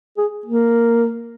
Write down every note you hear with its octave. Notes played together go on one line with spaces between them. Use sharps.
G#4
A#3